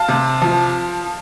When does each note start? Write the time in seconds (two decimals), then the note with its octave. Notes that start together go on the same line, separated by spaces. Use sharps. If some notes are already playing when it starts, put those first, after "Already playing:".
Already playing: F5 A5
0.08 C3
0.42 F3